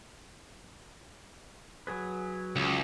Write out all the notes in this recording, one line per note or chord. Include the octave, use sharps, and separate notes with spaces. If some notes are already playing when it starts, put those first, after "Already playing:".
F#3 G#4 B4
C#2